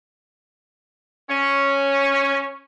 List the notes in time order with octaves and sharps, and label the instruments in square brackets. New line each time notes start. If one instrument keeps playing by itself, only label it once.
[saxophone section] C#4